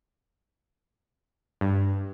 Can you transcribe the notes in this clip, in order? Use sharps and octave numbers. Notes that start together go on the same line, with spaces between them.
G2